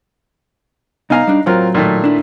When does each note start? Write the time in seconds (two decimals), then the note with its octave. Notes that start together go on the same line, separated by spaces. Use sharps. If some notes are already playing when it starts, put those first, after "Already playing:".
1.10 C2 B3 D#4 F5 G#5 A#5
1.27 G3 D4
1.46 A2 F#3 C4 F4 A#4
1.74 A#2 D#3 A3
2.04 D4 E4